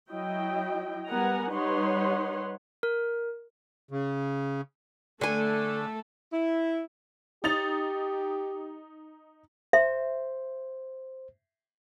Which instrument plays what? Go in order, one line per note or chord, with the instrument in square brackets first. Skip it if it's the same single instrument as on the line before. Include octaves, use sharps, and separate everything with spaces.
[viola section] F#3 E4 D#5 G5
G3 B3 A#4 F#5 G#5 A#5
G3 D#4 B4 C#5 F#5 C6
[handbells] A#4
[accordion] C#3
[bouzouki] D3 G#5 [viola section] A3 A4
[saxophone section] E4
[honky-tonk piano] D#4 A6 F7 [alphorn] G4
[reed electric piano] C5 [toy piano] E5